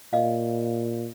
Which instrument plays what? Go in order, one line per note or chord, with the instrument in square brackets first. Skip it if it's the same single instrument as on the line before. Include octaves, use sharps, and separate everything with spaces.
[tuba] A#2 [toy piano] D#5 F5